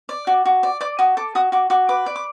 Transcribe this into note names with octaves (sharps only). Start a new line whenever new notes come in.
D5
F#4
F#4
D5
D5 D6
F#4 D#6
A4 D6
F#4 D#6
F#4 D6
F#4 D6
B4 D6
D5
D6